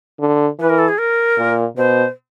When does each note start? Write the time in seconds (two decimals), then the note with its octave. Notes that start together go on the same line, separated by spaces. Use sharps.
0.20 D3
0.59 E3 B4
0.69 A#4
0.79 A4
0.88 G#4
0.98 A#4
1.38 A#2
1.76 B2 C5